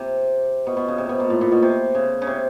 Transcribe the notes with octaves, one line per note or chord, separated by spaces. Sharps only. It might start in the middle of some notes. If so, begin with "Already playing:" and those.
Already playing: C3
B2
B2
C#3
C3
B2
A#2
A2
A#2
B2
C3
C#3
C#3
C3